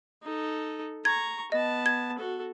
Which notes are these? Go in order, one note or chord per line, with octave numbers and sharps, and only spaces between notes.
D#4 A4
A#5 C#6 G#6
B3 D#5 A5
G#6
F#4 A4